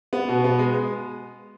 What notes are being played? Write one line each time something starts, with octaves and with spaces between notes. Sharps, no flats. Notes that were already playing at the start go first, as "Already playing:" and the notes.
B3
B2
B3
G#3